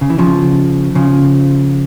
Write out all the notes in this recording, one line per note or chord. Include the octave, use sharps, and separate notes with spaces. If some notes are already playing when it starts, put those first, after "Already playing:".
C#3
E3
C#3 F3
C#3 F3